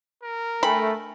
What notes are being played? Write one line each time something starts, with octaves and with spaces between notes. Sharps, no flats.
A#4
A3 D4 G5 G#5 B5